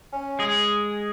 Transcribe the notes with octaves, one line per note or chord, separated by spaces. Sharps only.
C#4
G#3 G#4